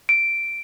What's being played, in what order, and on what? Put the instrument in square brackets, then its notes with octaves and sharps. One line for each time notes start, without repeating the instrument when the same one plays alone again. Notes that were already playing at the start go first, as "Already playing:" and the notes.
[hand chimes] D7